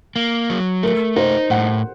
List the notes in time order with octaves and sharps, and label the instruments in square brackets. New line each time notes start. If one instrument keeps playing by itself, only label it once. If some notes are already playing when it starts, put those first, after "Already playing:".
[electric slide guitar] A#3
F#3
[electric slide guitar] A3 [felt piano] A#4
[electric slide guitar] D#4 [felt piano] C5
[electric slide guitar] A2 [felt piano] F#5